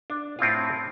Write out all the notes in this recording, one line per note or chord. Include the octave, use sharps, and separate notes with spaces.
D4
A2 C4 E4 F4